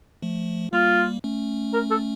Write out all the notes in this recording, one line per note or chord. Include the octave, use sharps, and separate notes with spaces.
F3 A3
G3 A#3 F4
A3 C#4
A#4
A4